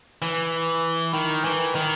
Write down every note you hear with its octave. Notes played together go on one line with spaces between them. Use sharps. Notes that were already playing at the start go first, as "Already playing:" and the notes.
E3
D#3
E3
D#3